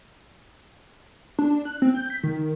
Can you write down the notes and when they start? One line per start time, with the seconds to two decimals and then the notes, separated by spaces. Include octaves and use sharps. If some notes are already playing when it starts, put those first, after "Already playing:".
1.39 D4
1.65 F#6
1.82 C4
1.95 G6
2.10 B6
2.24 D#3